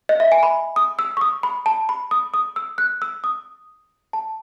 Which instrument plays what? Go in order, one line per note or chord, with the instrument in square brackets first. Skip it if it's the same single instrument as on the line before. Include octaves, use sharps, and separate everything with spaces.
[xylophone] D#5
E5
G#5
B5
D#6
E6
C#6
D#6
B5
A5
B5
D#6
D#6
E6
F#6
E6
D#6
A5